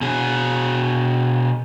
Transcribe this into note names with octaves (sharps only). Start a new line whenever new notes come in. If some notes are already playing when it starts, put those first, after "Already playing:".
B2 G#4